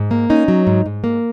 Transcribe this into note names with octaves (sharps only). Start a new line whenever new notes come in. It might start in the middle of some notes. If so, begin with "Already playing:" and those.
Already playing: G#2
A#3
C#4 D#4
F#3
G#2
G#2
A#3